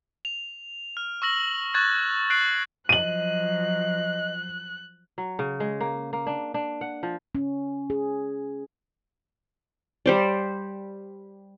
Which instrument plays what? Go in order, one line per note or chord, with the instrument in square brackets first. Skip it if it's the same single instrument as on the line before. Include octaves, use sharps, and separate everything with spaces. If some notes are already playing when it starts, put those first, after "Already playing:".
[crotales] F7
F6
C#6 E6 A#6 F#7
C#6 F#6 G#6 A6
F#6 A6 C7 D7 F#7
[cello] F3 F#3 [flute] D#5 [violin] F#6 [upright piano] D#7 F#7
[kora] F#3
C#3
G#3
A#3
A#3
D4
D4
F#5
F3
[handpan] C#4
G#4
[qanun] G3 C5 D5